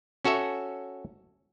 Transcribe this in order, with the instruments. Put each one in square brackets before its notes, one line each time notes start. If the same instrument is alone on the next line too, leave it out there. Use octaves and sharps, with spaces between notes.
[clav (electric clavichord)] C#4 F#4 A4 C#5 E5